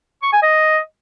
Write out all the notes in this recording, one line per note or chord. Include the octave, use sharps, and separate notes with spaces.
C#6
G#5
D#5